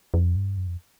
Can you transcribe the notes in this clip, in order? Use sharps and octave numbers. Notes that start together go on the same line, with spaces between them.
F2
G2
F#2
F2